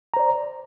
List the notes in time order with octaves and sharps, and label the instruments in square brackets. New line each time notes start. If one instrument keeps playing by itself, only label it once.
[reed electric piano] A#5
C5
D5